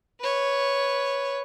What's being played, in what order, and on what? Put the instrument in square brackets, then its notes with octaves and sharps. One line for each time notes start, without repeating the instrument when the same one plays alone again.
[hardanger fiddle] B4 C#5